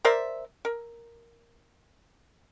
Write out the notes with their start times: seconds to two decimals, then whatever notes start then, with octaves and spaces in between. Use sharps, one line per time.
0.05 A#4 C5 D5 E5
0.65 A#4